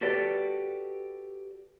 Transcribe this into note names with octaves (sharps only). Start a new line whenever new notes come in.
F#4 G4 A4 B4 D5